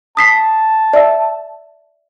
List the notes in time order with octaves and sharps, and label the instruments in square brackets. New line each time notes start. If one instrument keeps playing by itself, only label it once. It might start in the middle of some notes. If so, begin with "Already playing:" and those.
[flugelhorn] A5 [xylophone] D#6 B6 C7
[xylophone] D5 E5 E6